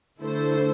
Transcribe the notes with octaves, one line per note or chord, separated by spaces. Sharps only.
D3 A3 E4 A4 C5